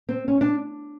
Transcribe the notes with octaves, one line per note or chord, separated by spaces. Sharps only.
C4
C#4
D4